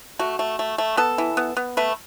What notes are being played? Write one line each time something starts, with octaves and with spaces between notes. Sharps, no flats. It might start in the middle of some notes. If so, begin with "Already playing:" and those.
A3 F#4
A3
A3
A3
B3 A4
E3
B3
B3
A3 B4